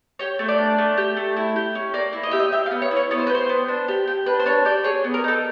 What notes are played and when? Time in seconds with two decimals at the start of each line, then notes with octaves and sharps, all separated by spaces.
0.19 G4 C#5
0.39 A3
0.48 D5
0.58 D4
0.78 A3
0.97 G4
1.17 A3
1.37 E4
1.56 G4
1.75 C#4
1.94 A#3 D5
2.13 E4
2.23 D#5
2.31 G4 E5
2.40 D#5
2.52 G4 E5
2.66 F5
2.71 B3
2.82 C#5
2.91 E4
2.96 C#5
3.11 B3 C#5
3.18 C5
3.27 B4
3.29 G4
3.35 C5
3.49 B3
3.68 D4
3.88 G4
4.07 G4
4.26 D4 B4
4.40 C5
4.46 D4 C#5
4.65 G4 D5
4.84 G#4 C#5
5.04 B3
5.14 A#4
5.24 D#4 A4